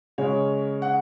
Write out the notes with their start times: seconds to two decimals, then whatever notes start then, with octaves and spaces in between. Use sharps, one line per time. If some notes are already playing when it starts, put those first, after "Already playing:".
0.18 C#3 G#3 C#4 C#5
0.82 F#5